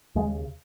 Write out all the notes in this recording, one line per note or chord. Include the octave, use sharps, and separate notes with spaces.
D#2 C#3 G#3